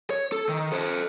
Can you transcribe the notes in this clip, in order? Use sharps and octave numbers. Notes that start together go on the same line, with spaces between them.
C#5
A4
D#3
A4 C5